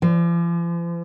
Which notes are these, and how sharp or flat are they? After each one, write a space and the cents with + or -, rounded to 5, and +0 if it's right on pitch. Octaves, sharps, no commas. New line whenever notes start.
F3 -45